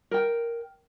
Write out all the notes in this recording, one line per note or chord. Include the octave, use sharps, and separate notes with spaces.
A#4 G5